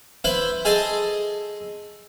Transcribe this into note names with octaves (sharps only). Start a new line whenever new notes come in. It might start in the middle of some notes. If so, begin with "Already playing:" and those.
E4 B4 C5 C6
G#4 A4 D#5 G#5 A5 C6